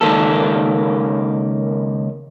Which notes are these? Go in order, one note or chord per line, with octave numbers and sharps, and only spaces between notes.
C#2 D#3 A#3 A4